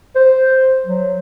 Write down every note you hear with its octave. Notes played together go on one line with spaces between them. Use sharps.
C5
F#3